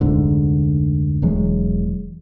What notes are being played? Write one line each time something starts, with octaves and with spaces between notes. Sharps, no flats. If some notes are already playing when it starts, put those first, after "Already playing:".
F1 D2 G#2 D3
E1 E3 F#3 G#3